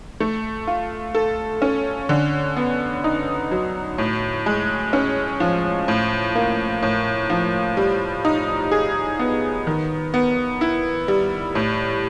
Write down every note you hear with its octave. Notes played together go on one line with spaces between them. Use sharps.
A3
F4
A4
C#4
D3
B3
D#4
F#3
A2
G#3
C#4
F3
A2
A#3
A2
F3
G3
D#4
G#4
B3
D#3
B3
E4
G3
A2